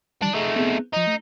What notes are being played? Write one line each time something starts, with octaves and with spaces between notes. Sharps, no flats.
D#3 E3 G3 D4
A3 D#4 G#4
B3 C4 G#4
F3 D#4 D#5
A3